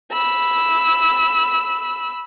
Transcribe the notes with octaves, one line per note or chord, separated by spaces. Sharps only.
B5 E6